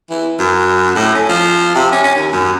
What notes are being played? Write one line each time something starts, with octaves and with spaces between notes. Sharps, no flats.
E3
F#2
A2
C#4
F3
C3
C#4
C#4
D#2
F#2